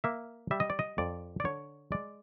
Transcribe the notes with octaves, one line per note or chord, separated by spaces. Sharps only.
A#3 E5
G3 E5
D#5
D5
D#5
F2 D5
D5
D3 C#5
G#3 D5